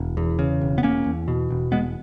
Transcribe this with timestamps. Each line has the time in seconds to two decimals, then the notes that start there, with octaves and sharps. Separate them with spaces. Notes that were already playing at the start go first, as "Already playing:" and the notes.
Already playing: E1
0.17 E2
0.39 C#3
0.61 E1
0.78 B3
0.83 E1 A#3 C#4
1.06 E2
1.28 B2
1.50 E1
1.71 E1 G#3 B3